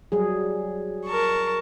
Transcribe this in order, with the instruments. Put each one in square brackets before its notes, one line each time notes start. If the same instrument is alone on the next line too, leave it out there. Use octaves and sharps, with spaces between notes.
[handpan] F#3 G3 G#4
[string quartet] A#4 A5 C#6